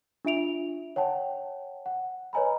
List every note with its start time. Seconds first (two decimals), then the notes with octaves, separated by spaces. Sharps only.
0.25 D4 F4 E5 D7 F7
0.96 C#5 F#5 G5 A5
1.86 F#5
2.33 B4 C#5 D#5 G#5 A#5 B5